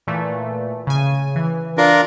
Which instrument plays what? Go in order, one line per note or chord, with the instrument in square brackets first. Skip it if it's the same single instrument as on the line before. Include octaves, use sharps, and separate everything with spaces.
[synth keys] A#2 E3 A3
C#3 G#5
E3
[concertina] D4 F4 A#4